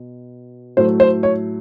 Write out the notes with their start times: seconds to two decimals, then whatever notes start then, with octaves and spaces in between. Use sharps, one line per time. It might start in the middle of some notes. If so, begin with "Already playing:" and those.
Already playing: B2
0.77 A2 F#3 A3 C5
1.00 C5
1.23 C#5